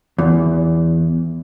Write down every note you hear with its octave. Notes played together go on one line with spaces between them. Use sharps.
E2